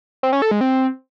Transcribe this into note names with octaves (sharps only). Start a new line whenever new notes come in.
C4
C#4
A4
G#3
C4